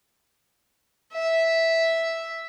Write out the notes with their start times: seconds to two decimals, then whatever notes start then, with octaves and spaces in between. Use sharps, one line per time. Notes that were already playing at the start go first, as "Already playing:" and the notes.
1.13 E5